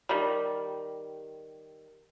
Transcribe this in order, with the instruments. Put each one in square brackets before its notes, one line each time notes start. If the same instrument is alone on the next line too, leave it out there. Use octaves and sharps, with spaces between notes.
[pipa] D#3 G3